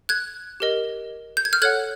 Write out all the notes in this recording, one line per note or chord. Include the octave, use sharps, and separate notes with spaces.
F#6 G#6
G4 A#4 D#5
G6
G#6
F6 G6
A4 C#5 F#5 F#6 G#6